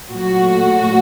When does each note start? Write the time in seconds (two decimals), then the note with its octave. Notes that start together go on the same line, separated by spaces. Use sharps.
0.11 A#2 F#3 A3 F#4